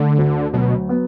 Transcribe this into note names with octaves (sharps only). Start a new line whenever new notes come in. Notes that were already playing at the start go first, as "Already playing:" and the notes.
Already playing: D3 A3
D2
B2 F#3
B3